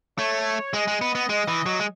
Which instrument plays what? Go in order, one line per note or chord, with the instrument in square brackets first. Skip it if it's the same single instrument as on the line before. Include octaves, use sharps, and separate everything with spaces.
[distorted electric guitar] A3 [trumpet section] C#5
[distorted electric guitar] G#3 [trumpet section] D#5
[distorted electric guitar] G#3
B3
B3
G#3
E3
F#3
G#3